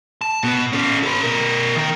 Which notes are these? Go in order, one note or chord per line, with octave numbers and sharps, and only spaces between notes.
A5
B2 B3
C#4 A4
A4 B4
B2 A#4
D#3 A#4